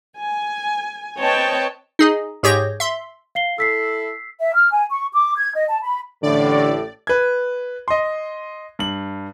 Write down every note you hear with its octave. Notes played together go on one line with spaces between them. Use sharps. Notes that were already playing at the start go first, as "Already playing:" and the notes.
G#5
C4 B4 C#5 D#5 G5 A5
D#4 G#4 D#5
G#2 G4 G#4 C#5 G6 A#6
E5 C6
F5 C7 G7
E4 A4 E6 B6 C7
E5
F6
G#5
C#6
D6
G#6
D#5
A5
B5
A1 A2 D3 D5
B4 G#6
D#5 C6
G2 F#7